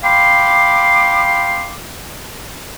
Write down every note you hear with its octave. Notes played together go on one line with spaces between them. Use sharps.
F5 G5 B5 C6 D6